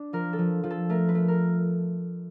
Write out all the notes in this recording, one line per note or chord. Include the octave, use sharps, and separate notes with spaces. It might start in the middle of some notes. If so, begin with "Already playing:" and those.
Already playing: D4
F3 A#4
A4
F3
F3
A4
A3 A#4
B4
A3
A#4